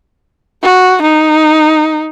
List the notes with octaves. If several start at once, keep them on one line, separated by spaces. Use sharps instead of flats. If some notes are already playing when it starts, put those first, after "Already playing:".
F#4
D#4